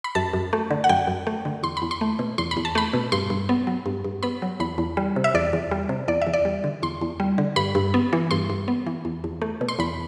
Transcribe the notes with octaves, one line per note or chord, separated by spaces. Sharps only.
B5
F#2 A5
F#2
A3
D3
F#5
F#2 G5
F#2
A3
D3
E2 C6
B5
E2
C6
A3
B2
E2 C6
B5
E2
A5
A3 B5
B2
G2 C6
G2
B3
F#3
G2
G2
B3 B5
F#3
E2 B5
E2
G3
C3
E5
E2 D5
E2
G3
C3
E2 D5
E5
E2
D5
G3
D3
E2 C6
E2
G3
D3
G2 B5
G2
B3
E3
G2 C6
G2
B3
E3
E2
E2
A3
B2
C6
E2 B5